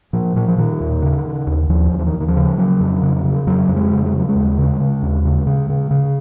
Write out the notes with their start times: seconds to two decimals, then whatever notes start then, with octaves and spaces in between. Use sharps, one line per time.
0.13 A#2 F3
0.36 A#2 F3
0.48 F3
0.58 A#2 D#3
0.81 D#2
1.02 C#3
1.25 C#3
1.47 D#2
1.69 D#2 F3
1.92 D#2
1.99 F3
2.07 D#3
2.13 D#2
2.21 D#3
2.28 F3
2.36 C#3
2.58 C#3 F#3
2.81 F2
3.02 C#3
3.24 C#3
3.47 F2 F#3
3.69 F2
3.76 G#3
3.91 C#3
4.06 G#3
4.13 C#3 F#3
4.29 G#3
4.35 D#2
4.58 C#3
4.80 C#3
5.03 D#2
5.24 C#3
5.47 C#3
5.69 C#3
5.91 C#3